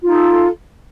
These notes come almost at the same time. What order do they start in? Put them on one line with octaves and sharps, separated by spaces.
F4 D#4 A4